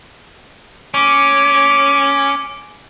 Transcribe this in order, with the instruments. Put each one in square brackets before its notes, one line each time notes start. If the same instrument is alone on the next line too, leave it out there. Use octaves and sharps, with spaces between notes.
[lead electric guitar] C#4 [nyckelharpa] D6